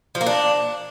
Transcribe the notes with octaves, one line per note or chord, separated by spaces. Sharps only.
F3
A#3
D4